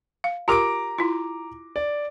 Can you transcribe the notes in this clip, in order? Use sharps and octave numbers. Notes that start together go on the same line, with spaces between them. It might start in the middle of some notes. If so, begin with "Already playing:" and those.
F5
F4 G4 A#4 A#5 D6 D7
E4 F4
D5